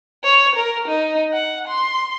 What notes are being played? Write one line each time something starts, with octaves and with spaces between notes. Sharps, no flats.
C#5
A#4
D#4
F#5
C6